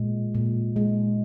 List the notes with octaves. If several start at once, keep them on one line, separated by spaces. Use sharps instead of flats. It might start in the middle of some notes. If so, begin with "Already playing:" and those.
Already playing: A#2 G#3
A#2
G#3